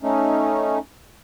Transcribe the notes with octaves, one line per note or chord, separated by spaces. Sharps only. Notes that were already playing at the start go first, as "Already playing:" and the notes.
A3 C#4 D#4